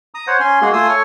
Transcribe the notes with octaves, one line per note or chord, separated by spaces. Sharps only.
A#5 D#6
C5 C#5 F#5
C#4 G#5 C6
G#3 A#3 F#4 G#4 C6
A3 F4 G#5 C6 D#6 E6
A4 C#5 C#6 F6